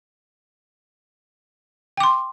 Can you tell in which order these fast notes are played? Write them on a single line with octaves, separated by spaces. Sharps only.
G5 D6 C6